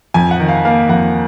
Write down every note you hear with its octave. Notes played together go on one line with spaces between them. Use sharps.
F2 G#5
F#5
D#3
F5
A#3 F5
F2 F#5